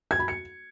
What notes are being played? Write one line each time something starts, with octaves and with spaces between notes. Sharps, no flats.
G#6
B5
C#7